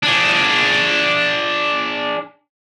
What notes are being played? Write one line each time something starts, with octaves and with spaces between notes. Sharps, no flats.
D4 G#4